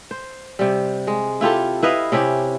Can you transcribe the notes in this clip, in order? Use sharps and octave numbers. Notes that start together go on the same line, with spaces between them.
C5
C3 G3
G#3
E4 F4 G4 A4
E4 B4 D#5 F5
C3 C#4 E4 G4